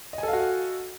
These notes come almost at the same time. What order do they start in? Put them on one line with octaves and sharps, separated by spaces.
D#5 G#5 A4 F5 F#4